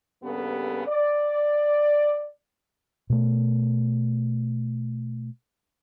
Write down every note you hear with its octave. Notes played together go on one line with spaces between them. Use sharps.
G2 C#3 A#3 B3 G4 A4
D5
B2 A3